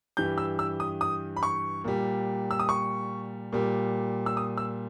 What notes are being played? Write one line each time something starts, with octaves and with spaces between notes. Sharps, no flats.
G2 E3 G3 G6
E6
E6
D#6
D#6
B5
C#6
A#2 G3
E6
D#6
C#6
A#2 G3
E6
D#6
E6